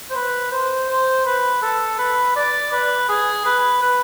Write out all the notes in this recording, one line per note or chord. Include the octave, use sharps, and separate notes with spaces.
C5
B4
C5
C5
B4
A4
B4
D5
B4
G#4
B4
B4